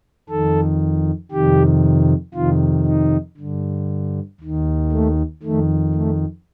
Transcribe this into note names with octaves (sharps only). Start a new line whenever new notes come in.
F2 D#3 A4
F2 C3 D#3 G4
F2 C3 D#3 F4
D#4
G2 D3
D#2 D#3
A3
F2 D#3 A3
A3